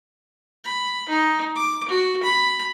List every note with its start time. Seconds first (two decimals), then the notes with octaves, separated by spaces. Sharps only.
0.65 B5
1.09 D#4
1.55 D6
1.89 F#4
2.23 B5